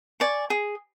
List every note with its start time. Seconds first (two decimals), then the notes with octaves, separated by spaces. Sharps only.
0.20 D5 G#5 C#6
0.50 G#4